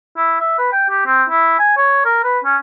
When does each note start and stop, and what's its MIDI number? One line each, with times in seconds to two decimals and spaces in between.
0.17 0.35 64
0.40 0.57 76
0.58 0.70 71
0.72 0.85 79
0.89 1.05 67
1.06 1.23 60
1.30 1.56 64
1.59 1.74 80
1.77 2.04 73
2.05 2.22 70
2.24 2.39 71
2.44 2.57 61